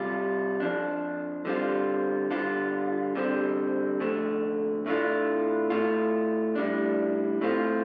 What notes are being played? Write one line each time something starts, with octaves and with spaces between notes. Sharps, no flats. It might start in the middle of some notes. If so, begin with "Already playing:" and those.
Already playing: C3 G3 F4
F2 F3 D4
D3 G3 C4 F4
D3 G3 F4
D3 G3 C4
F2 D3 A3
A2 A3 D4 F4
A2 A3 F4
A2 G3 D4
A2 A3 C4 F4